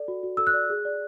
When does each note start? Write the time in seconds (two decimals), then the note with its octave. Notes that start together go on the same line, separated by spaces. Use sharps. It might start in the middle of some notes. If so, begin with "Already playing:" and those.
Already playing: A4 D5
0.08 F#4
0.23 F#4
0.37 A4 E6
0.47 F#6
0.54 D5
0.70 G#4
0.85 D5